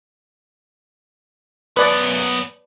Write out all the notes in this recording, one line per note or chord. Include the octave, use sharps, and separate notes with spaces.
F#2 B3 B4 D5